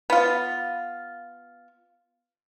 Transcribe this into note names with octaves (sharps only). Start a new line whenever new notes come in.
B3 F4